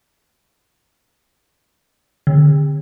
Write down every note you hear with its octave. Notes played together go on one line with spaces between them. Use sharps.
D3